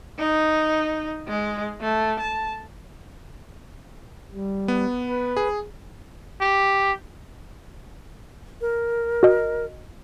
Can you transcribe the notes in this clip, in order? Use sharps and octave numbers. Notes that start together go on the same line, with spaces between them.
D#4
G#3
A3
A5
G3
B3
B4
G#4
G4
A#4
F#4 D#5